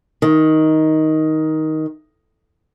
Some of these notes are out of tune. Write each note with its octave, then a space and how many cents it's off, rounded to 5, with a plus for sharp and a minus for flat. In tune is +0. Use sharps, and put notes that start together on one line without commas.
D#3 +10